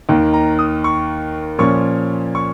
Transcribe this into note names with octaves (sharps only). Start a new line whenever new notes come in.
D#2 D#3 A#3
A#5
D#6
C#6
A#2 F3 C#4 C#6
C#6